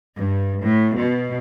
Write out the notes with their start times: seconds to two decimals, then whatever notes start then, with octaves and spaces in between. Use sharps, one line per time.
0.16 G2
0.60 A2
0.95 B2